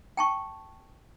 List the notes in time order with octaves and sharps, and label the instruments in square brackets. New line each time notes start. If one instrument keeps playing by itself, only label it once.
[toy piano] G5 A5 C#6